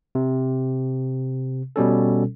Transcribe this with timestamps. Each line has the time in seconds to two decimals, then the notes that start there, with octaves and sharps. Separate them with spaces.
0.15 C3
1.76 B2 G3 C#4 A4